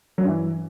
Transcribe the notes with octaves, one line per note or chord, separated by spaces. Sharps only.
F#3
G2
E3